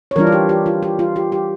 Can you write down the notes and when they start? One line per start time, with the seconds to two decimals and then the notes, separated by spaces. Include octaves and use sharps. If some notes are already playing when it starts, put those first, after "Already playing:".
0.11 C#5
0.16 E3 G3 D4 F4 A#4
0.27 F4
0.32 G4
0.49 G4
0.66 F4
0.83 G4
0.99 F4
1.16 G4
1.32 G4